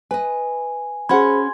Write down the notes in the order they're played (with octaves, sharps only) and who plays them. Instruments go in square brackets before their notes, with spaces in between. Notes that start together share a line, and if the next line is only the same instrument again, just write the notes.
[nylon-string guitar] B4 D#5 [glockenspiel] G#5
[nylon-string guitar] C#4 F#4 F#5 [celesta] G#4 C5 B5 [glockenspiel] C6 G#6